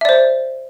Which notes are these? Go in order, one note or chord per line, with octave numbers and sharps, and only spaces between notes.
C5 D5 E5